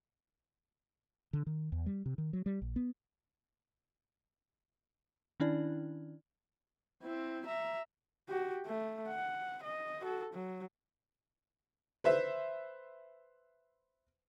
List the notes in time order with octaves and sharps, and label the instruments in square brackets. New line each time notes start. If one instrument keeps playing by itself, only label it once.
[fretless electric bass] D3
D#3
E2
G3
C3
D#3
F#3
G3
A#1
B3
[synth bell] D#3 C#4 D4 E4 D5
[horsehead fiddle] C4 E4
E5 A#5
F#4 G4
A3
F#5
D#5
F#4 A4
F#3
[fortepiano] B4 C5 E5